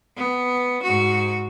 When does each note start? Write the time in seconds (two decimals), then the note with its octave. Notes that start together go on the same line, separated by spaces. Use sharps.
0.17 B3
0.83 G#2 F#4